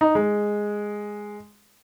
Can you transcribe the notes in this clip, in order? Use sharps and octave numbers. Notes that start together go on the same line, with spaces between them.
D#4
G#3